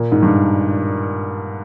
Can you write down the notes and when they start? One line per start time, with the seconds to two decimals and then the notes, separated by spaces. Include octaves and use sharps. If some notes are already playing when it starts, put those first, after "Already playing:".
Already playing: A#2
0.12 G#2
0.22 G2